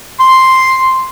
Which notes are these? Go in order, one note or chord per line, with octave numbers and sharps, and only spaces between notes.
C6